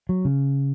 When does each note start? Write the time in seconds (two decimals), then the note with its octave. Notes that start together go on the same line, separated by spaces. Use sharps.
0.09 F#3
0.25 C#3